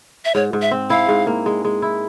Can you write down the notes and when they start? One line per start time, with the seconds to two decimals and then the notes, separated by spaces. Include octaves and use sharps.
0.25 E5
0.35 G#2 C#5
0.53 G#2
0.62 E5
0.71 C4
0.90 E4 F5
1.09 G#2
1.27 A#3
1.46 G#3
1.65 G#3
1.82 E4